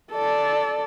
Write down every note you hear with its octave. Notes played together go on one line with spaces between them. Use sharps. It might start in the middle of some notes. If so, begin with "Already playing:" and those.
A4 D5